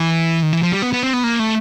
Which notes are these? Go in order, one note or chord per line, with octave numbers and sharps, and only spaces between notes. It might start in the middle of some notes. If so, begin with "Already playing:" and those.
Already playing: E3
D#3
E3
F3
G3
B3
B3
C4
B3
A#3
A3